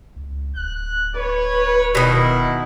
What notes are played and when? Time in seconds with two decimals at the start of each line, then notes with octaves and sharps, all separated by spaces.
0.16 C#2
0.56 D1 F#6
1.15 B4 C#5
1.95 B2 D#3 E4